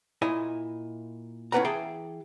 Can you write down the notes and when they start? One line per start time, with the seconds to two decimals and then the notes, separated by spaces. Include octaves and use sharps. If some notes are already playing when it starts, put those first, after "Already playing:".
0.22 A#2 E4 D#5 G#5
1.52 A2 C#4 D4 B4 F#5 A#5
1.65 E3 G#4 G5 A5